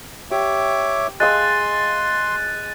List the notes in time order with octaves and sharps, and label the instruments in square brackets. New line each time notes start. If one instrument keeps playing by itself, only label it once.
[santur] G4 [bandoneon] C#5 E5 D6
[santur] G#3 F5 E6 [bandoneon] C6 [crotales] F#6 A6 D#7